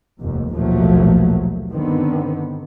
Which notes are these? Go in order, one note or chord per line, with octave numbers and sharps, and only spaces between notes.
F1 D#2
A#1 D#2 B2 F3 F#3 A3
G2 D3 D#3 B3 C4